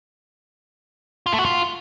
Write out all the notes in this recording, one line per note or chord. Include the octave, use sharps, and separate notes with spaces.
F4
A3
F#4
F4